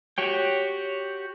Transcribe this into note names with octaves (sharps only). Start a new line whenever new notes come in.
F#4 G4 C#5 G5